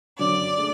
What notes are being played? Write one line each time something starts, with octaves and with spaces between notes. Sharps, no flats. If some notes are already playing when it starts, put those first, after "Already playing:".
F#2 D3 F#3 C#4 D5 D6
A3 D4 G#4